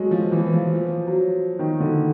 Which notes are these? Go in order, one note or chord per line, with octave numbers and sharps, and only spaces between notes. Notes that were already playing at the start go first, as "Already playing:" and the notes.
Already playing: F#3 G#3 A3
F3
E3
F3
F3
F#3
D#3
D3